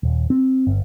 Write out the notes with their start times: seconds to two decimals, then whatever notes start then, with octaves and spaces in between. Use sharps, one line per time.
0.03 D#1
0.30 C4
0.67 G1